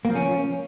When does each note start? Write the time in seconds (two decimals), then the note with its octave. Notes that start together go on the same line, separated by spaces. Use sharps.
0.05 A#3
0.10 F3
0.15 C#4